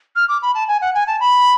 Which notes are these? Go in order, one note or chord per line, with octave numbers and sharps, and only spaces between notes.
F6
D6
B5
A5
G#5
F#5
G#5
A5
B5